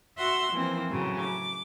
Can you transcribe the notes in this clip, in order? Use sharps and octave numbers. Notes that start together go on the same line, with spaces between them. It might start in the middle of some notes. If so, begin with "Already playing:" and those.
F#4 E5 F#5 C6 E6
E3 F3 A#3 C4
A2 C#3 F#3
D6